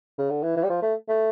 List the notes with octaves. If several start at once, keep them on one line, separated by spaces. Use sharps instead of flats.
C#3
D3
E3
E3
G3
F3
A3
A3